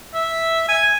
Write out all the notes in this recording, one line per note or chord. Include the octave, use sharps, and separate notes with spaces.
E5
G#5